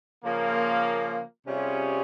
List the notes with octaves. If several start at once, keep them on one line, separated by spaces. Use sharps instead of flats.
C#3 F3 A#3 F4
C3 G3 C#4 F4 G#4